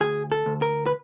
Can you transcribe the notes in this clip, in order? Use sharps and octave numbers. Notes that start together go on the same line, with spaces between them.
D2 G#4
A4
D2
A#4
B4